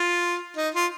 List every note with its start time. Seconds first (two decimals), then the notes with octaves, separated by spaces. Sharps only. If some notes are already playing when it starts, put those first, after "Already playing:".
Already playing: F4
0.57 D#4
0.75 F4